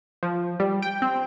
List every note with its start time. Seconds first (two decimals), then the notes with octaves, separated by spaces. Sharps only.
0.23 F3
0.60 G3
0.82 G5
1.02 C4